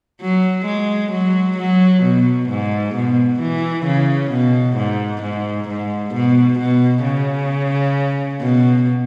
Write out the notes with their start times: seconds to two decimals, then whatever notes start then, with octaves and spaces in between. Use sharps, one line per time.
0.22 F#3
0.66 G#3
1.12 F#3
1.58 F#3
2.03 B2
2.50 G#2
2.95 B2
3.40 E3
3.86 C#3
4.31 B2
4.77 G#2
5.22 G#2
5.69 G#2
6.14 B2
6.59 B2
7.04 C#3
8.41 B2